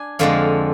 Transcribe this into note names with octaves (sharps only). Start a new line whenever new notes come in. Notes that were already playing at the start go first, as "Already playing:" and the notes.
Already playing: D4 G#5
F2 D3 G#3 F5